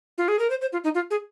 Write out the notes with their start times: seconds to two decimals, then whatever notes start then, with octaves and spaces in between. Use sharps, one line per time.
0.18 F4
0.28 G#4
0.39 A#4
0.50 C5
0.61 C5
0.73 F4
0.84 D#4
0.95 F4
1.11 G#4